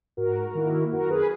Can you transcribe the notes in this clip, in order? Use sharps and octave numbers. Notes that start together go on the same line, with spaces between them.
G#2 F#4 A#4
D#3 A#3 E4
F#2 F#4 A#4
G#4 B4